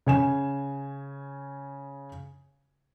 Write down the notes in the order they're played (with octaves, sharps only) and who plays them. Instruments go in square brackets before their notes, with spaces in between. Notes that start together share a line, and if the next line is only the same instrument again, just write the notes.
[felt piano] C#3 G#5 E7